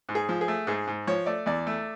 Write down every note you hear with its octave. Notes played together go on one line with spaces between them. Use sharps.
G#2
G#4
F3
G#4
A3
G#2 G#4
G#2
F3 C#5
A3 D5
E2 D5
A3